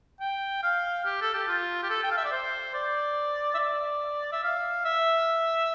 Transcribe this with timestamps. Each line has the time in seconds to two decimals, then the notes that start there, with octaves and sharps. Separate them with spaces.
0.21 G5
0.63 F5
1.06 G4
1.21 A4
1.35 G4
1.48 F4
1.83 G4
1.90 A4
2.04 G5
2.11 F5
2.18 E5
2.25 D5
2.32 C5
2.74 D5
3.54 E5
3.59 D5
4.32 E5
4.44 F5
4.85 E5